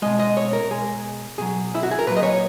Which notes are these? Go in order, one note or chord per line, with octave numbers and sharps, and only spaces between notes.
B2 G#3 D#5
D#5
C#5
A#4
B2 G#3 G#4
B2 F#3 G#4
E4
F#4
G#4
A#4
A#2 F#3 B4
D#5
C#5